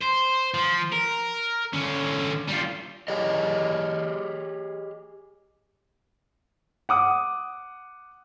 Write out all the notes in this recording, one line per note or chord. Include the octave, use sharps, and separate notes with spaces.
C5
F3
A#4
D3 C#4
G3 F4
G4 G#4 C#5 D#5
F#5 D6 D#6